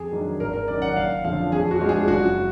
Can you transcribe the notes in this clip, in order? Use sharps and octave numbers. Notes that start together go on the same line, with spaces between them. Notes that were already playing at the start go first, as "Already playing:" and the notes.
Already playing: F2 G#4
D#3 F#3 D4
G#1 A#4
A#4
F#2 D#3 D5
F#5
F#1 F5
F2 D3 F3 F5
F2 G#4
F#4
F3 G#3 D4
G#4
F#1 F#4